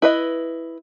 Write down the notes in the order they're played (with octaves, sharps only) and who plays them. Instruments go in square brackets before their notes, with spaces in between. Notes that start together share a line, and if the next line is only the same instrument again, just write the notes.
[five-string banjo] E4 B4 D#5